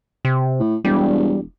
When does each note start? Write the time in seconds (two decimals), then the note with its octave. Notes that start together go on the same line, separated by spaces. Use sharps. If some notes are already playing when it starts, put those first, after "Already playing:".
0.25 C3
0.59 A2
0.85 E1 G3